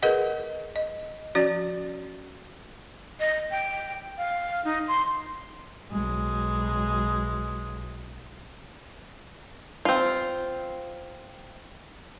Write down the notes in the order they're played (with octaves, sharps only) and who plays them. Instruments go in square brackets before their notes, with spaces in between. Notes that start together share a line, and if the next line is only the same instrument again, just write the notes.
[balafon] G#4 A#4 B4 D#5 F#5
D#5
F3 C#4 F#4 D5
[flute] D#5
G5
F5
D#4
C6
[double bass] B1 G#3
[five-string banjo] C4 F4